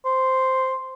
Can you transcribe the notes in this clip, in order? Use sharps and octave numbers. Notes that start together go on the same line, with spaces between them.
C5